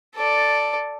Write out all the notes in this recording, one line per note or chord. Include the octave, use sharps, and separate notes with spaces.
A4 D5